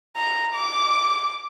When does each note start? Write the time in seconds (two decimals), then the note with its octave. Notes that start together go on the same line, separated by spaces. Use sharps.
0.16 A#5
0.55 D6